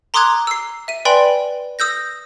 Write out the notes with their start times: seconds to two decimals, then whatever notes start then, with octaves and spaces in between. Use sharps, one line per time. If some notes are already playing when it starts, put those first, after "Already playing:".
0.14 A#5 C6 D6 D#6 F#6 G#6
0.47 E6 C7
0.88 E5 D#7
1.05 B4 D5 G5 G#5 B5 C6
1.79 D#6 E6 G6 A#6